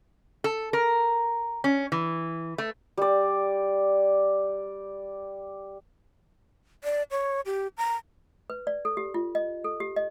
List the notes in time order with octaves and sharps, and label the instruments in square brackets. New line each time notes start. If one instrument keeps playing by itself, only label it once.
[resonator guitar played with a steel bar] A4
A#4
C#4
E3
A3
[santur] G3 D5
[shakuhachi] D5
C#5
G4
A#5
[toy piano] B4
D5
A4
G4
F4
D#5
A4
G4
D#5